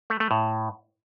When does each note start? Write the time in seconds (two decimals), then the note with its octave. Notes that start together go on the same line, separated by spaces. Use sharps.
0.10 A3
0.20 A3
0.31 A2